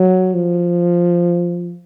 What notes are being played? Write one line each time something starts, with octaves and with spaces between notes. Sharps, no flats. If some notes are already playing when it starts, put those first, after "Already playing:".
Already playing: F#3
F3